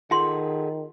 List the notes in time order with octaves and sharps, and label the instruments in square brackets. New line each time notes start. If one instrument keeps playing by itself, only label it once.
[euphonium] D#3 [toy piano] F4 C6 [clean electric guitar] G#4 A4 F#5